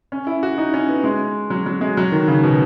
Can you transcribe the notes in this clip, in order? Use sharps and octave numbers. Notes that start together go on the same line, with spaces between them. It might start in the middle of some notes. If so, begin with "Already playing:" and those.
C#4
E4
F#4
D#4
C#4
B3
G#3
F#3
F#3
G#3
F#3
D#3
C#3
B2